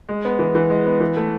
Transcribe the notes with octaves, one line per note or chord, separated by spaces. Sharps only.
G#3
B3
E3
E3
G#3
B3
E3
A3